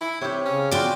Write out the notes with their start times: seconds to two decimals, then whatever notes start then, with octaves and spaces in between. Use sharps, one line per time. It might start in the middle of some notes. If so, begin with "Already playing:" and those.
0.01 E4
0.21 C3 G4 C#5
0.45 C#3 C#4
0.71 B3 F4 F#4 D5 G5